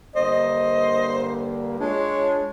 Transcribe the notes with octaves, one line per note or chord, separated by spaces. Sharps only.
G2 D3 A#3 C5 D#5
G#3 D4 F4 C#5